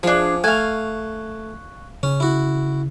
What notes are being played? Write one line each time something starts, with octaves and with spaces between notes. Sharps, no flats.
F3 D4 G#4
A3 F5 G#5 C#6 F#6
C#3 C#4
E4 F#4